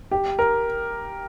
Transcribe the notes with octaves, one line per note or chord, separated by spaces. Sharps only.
G4
A#4